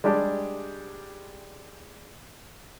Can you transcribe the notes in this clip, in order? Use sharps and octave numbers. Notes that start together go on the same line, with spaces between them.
G3 G#3 D4 G4